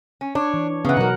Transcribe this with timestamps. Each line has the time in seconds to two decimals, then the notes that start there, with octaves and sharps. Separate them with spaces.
0.21 C#4
0.35 D4 C#5
0.54 E3
0.85 C#3 E3 B3 F#5
0.97 B2 F#3 D#4 F#4 A#4